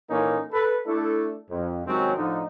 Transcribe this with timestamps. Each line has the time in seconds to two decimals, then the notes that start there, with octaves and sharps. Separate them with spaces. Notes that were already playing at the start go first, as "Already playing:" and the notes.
0.10 A#2 E3 A#3 C#4 D#4 A4
0.52 A4 B4
0.86 A3 D4 E4 A4
1.50 F2
1.86 C3 D#3 F#3 G#3 C4 C#4
2.15 A2 D3 F3 D#4